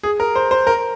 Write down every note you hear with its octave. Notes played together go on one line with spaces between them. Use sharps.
G#4
A#4
C5
C5
A#4